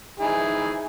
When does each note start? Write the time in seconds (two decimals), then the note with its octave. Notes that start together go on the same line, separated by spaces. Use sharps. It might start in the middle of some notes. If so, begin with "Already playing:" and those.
0.20 D#4 E4 G#4